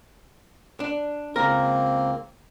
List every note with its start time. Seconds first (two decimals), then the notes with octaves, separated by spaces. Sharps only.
0.80 D4
1.36 C#2 A#3 C4 A#4